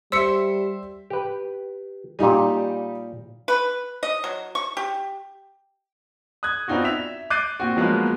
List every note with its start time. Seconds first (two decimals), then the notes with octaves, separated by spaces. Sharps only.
0.12 G3 C5 E5 E6 B6 C#7
1.10 G4 B4
2.19 A#2 G3 D#4 G4 G#5
3.48 B4
4.03 D#5
4.24 F#3
4.55 C#6
4.77 G4
6.43 D#6 F#6 G#6
6.68 B3 C4 D4 D#4 F4 F#4
6.84 E5 B6 F7
7.30 D6 F#6 G6 A6 C7 D#7
7.60 A#2 C4 F#4
7.77 F3 F#3 G#3 A#3 B3 F4